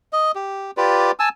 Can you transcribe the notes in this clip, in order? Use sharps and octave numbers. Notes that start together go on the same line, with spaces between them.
D#5
G4
F4 G4 B4 D5
G#5 A5 E6